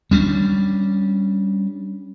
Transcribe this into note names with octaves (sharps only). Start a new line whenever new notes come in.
G3 C#4 D4